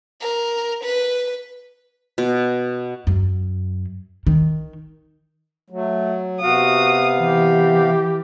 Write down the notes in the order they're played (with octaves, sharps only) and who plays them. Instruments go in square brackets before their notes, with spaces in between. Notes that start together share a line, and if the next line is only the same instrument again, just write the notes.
[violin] A#4
B4
[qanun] B2
[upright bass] F#2
D#3
[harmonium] F#3 [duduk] A3
[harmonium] C3 B3 F5 [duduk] F#4 [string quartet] D#6
[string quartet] E3 [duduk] G4